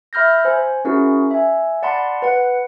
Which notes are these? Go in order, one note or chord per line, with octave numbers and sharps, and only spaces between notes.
E5 B5 F6 G6 A#6
C5 G#5
C#4 E4 F#4 G#4 A#4
E5 G#5
D5 F#5 A5 B5 C6
B4 F#5